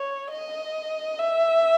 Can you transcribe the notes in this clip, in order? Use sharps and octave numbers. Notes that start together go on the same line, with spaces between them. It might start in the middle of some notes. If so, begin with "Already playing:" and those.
Already playing: C#5
D#5
E5